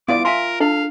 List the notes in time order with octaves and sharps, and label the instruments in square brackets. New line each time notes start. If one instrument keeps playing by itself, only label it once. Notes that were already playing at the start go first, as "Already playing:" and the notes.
[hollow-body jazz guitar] B3 E4 D5 [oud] F4 [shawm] D6
[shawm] A#4 [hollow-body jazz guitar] E5 G#5 C6
[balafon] D4 [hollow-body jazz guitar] A4 [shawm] F5